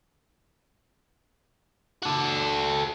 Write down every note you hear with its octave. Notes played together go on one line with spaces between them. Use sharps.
F#4 A4